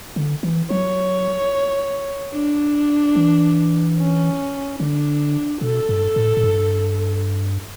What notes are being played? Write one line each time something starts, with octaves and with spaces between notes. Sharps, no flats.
D3
E3
F#3 C#5
D4
E3
C#4
D3 D4
B2 A4
G2
A2
A2
G2